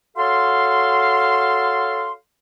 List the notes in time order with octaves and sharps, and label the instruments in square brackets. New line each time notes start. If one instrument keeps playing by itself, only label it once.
[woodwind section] F#4 A4 C#5 F5 C6